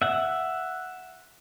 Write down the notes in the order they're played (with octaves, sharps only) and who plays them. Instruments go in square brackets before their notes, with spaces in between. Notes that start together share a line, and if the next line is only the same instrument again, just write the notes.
[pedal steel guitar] E5 F#5